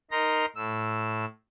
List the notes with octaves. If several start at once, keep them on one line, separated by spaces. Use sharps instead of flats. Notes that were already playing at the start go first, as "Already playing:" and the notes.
D#4 A#4 A#5 C6 A#6
A2 E6